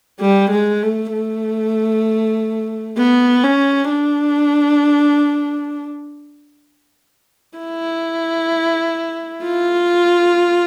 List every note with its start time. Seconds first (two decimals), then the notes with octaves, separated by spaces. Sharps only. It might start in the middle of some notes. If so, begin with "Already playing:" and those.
0.20 G3
0.51 G#3
0.83 A3
1.13 A3
2.97 B3
3.44 C#4
3.90 D4
7.58 E4
9.43 F4